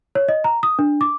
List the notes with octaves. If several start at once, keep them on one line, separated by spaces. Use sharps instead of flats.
C#5
D#5
A#5
D#6
D4
D6